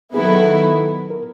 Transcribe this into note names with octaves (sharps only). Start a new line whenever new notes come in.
D#3 F#3 B3 E4 G#4
A4
A4
A#4